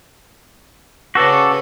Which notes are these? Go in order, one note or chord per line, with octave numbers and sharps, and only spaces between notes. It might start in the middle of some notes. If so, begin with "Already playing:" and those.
C#3 C#4 F#4 A4 B4 D5